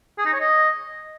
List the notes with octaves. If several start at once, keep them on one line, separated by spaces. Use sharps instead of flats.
G#4
D#4
C#5
D#5